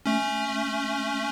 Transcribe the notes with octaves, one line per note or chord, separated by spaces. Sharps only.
A3 C#4